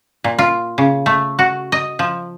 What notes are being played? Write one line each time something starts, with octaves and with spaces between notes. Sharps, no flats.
A#2
F4
C#3
A3
F#4
D#5
F3